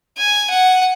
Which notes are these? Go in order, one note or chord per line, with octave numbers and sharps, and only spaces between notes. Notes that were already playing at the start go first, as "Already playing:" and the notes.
G#5
F#5